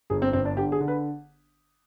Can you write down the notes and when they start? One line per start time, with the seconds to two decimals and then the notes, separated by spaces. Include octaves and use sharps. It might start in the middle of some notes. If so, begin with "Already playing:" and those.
0.10 G1 G#4
0.22 C4
0.33 G1 C4
0.45 D4
0.57 D3 G4
0.72 G#4
0.80 D3
0.88 B4